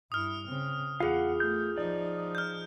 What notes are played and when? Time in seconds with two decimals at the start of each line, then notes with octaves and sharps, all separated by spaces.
0.12 G2 E4 D#6 F6
0.47 C#3 C4
1.00 E2 F4 G#4 F5 F#5
1.40 A3 G6
1.78 F3 D#4 D5
2.35 F6 G6